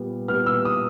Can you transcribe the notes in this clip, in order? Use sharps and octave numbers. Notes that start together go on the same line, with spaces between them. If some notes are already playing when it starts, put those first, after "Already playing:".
Already playing: A#2 G3 B3
A#2 G3 B3 F6
E6
D#6